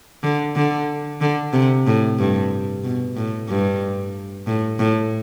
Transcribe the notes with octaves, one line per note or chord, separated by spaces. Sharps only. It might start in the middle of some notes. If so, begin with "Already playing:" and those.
D3
D3
D3
C3
A2
G2
B2
A2
G2
A2
A2